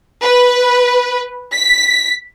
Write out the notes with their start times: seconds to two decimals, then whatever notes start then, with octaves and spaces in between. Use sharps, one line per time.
0.21 B4
1.54 B6